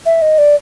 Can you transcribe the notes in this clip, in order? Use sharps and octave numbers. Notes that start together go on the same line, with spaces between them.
E5
D#5
D5